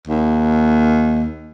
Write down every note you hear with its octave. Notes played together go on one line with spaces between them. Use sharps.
D#2